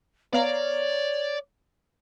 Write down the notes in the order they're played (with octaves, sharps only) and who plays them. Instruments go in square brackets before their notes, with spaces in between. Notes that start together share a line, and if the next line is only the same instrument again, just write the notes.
[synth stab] B3 F5 A#5 [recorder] C#5 [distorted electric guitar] D5